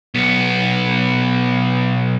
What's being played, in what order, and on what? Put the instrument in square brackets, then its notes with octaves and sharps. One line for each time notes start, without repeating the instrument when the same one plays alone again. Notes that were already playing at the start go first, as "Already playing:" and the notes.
[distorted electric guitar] B1 B3